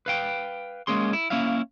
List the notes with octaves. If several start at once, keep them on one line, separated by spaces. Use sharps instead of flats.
B4 F5 G5
G#3 A#3 C#4 G#4 C6
E4
A#3 C#4 E4 E5 F5